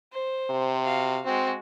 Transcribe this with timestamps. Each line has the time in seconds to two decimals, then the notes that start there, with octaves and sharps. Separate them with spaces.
0.13 C5
0.50 C3
0.83 F#4 F5
1.25 G#3 C4 F#4